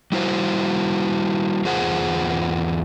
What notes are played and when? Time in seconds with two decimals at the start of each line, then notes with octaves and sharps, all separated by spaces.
0.12 G3 E4 F#4 C5
1.65 E2 F4 G#4 C5 F#5